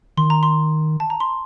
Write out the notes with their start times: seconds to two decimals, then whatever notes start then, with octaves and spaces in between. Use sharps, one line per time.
0.17 D#3 C6
0.30 A#5
0.43 C6
1.00 A5
1.10 A#5
1.20 C6